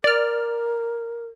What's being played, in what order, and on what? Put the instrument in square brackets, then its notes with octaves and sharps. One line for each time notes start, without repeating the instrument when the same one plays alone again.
[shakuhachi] A#4 [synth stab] D5 F6